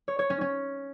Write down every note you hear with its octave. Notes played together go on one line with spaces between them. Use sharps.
C#5
C#5
C#4
C#4